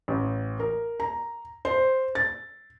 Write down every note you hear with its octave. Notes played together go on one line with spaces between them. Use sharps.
A1
A#4
A#5
C5
A6